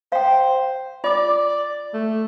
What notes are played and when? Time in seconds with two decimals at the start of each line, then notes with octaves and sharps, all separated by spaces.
0.12 C5 F5 G5
1.04 F4 D5 D6
1.94 A3